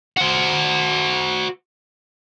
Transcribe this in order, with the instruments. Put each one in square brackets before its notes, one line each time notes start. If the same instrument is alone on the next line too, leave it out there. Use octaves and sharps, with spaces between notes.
[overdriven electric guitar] F#4 C5